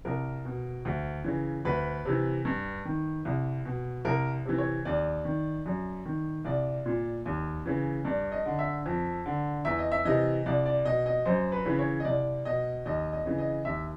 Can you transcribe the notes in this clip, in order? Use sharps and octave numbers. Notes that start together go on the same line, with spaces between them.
C2 A#4
B2
D2
C#3 E3
D2 B4
C3 E3
G2
D#3
C2
B2
C2 A#4
C3 E3
C#5
D#2 D5
D#3
F#2
D#3
C2 D5
A#2
D#2
C#3 E3
G2 D5
D#5
D3
E5
F2
D3
E2 E5
D#5
E5
C3 E3 D#5
C2 D5
D5
B2 D#5
D#5
F#2 C5
B4
C#3 E3
C#5
D#5
C2 D5
B2 D#5
D#2 D#5
D#5
C#3 E3
D#5
D#2 E5